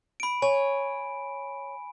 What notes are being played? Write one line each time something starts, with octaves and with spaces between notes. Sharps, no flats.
B5 D7
C#5 G#5